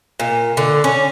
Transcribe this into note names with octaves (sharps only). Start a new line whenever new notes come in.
A#2
D3
C#4